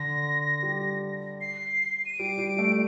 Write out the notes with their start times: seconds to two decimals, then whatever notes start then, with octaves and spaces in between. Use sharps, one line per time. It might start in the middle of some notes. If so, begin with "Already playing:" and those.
Already playing: D3 A#6
0.63 G3
1.41 C7
2.06 D#7
2.19 G3 D7
2.38 G3
2.59 A3